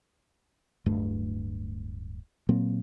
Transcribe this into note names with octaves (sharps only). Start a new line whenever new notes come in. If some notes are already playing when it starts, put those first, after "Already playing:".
D1 G2 A3
A#2 F#3 A#3 C4